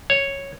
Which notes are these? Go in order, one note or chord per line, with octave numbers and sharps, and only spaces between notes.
C#5